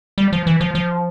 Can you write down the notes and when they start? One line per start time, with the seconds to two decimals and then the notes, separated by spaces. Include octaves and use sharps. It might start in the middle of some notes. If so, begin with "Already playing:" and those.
0.18 G3
0.33 F3
0.47 E3
0.61 F3
0.75 F3